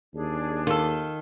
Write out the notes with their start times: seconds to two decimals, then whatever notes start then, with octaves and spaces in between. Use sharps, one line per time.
0.14 D#2 D4 G#4
0.67 D#3 F4 A4